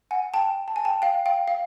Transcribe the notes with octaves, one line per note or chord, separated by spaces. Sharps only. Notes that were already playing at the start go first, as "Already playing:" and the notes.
F#5 G#5
G5 A5
A5
G#5
G5 A5
F5 G5
F5 G5
F5